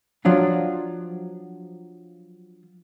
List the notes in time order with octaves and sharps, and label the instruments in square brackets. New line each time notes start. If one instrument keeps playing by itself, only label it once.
[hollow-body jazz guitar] F3 F#3 D4 F4